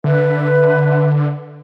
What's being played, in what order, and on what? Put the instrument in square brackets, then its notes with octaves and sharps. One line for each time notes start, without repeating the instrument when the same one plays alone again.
[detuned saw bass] D3 [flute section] B4 E5